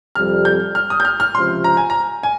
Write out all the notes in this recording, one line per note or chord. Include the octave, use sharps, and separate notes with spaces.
F2 C3 G3 F6
G6
F6
D#6
G6
F6
F6
C#2 C3 F3 C6
A#5
G#5
A#5
G#5